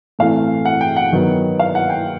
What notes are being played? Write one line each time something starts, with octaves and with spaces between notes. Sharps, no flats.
A2 E3 A3 C4 F5
F#5
G5
F#5
D#3 F#3 B3
F5
F#5
G5